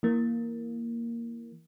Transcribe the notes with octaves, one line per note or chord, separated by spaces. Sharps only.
E3 A#3